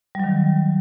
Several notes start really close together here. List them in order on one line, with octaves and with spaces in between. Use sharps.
G3 F#3 D#3